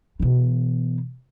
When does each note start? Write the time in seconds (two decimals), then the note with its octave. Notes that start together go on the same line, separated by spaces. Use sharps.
0.20 B2 E3